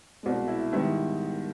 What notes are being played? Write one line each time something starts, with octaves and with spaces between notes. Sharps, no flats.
C2 B2 G#3
E4 E5
G#2 D#3 G3 B3 E4 E5